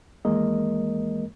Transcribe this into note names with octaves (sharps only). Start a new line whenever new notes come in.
D#2 E3 G#3 A#3 A#4 D#5